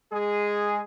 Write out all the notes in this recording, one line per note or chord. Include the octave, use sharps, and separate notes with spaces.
G#3 G#4